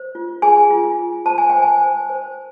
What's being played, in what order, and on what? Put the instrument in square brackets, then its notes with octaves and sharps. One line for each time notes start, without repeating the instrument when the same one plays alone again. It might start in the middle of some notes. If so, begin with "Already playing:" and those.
Already playing: [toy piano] C5
F4
G#4 G#5
F4
F4
C5 A5
G#5
C5 G5
G#5
C5
C5